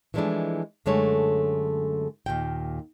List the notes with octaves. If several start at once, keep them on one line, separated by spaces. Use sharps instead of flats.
E3 F3 G#3 A3 D4 E4
F#2 D3 G#3 A3 C#5
D#2 A#2 G5